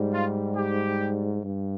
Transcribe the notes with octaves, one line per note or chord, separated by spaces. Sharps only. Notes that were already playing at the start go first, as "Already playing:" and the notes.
Already playing: G#2 G3
F4
G4
G2